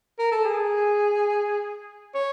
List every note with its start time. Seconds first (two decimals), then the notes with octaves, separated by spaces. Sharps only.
0.19 A#4
0.31 A4
0.44 G#4
2.15 C#5